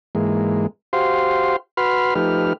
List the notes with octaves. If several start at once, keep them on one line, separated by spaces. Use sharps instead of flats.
G#2 E3 G#3 A#3
F#4 G4 C5 F5 C6
F#4 B4 B5 C6 F6
F3 A3 D#4 G4 B4 F6